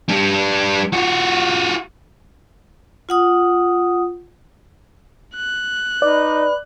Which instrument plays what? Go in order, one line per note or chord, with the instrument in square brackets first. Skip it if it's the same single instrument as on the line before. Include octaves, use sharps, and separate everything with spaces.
[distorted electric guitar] G3 D4
F4 F#4
[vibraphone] F4 F#5 D#6
[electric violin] F#6
[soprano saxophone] D#4 [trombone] B4 [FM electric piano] D5